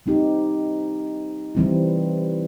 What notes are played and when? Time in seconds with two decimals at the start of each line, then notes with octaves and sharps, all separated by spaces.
0.06 G3 C4 D#4 G4
1.55 E3 G3 C4 E4